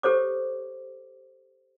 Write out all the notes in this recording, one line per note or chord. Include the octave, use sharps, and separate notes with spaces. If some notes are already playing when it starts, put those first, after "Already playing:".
G4 A4 C5 C#5 D6